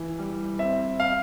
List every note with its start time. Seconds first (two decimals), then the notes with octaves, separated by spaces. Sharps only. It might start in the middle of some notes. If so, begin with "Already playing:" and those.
Already playing: E3
0.18 G3
0.59 C4 E5
1.00 F5